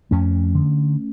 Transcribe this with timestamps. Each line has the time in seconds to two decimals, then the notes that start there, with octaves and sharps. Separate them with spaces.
0.11 F2 A3 C#4
0.54 D3